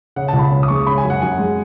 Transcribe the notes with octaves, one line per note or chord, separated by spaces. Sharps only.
C#3 F#5
A5
C#2
B5
C#4
D#6
G#3 C#6
C#3 B5
G#5
F#2
F#5
F#2 G#5
G#3